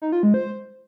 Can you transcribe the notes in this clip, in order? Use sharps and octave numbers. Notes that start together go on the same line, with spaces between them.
D#4
F4
G#3
C5